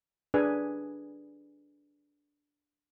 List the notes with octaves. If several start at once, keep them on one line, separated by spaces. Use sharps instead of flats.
D4 G#4 B4 G#5